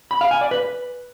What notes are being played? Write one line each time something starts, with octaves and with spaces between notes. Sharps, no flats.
B5
F5
G#5
D5
B4